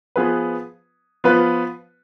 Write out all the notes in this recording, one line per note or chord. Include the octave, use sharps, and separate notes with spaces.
F3 B3 F4 G#4 B4
F3 B3 F4 B4